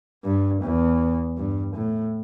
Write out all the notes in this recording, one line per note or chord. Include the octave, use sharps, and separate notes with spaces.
G2
E2
G2
A2